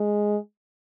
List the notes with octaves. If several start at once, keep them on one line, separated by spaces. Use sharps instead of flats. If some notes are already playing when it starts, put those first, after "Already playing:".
Already playing: G#3